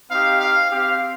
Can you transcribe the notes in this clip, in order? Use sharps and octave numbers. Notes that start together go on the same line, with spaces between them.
C4 D#4 G4 F5
F5
C4 G4 F5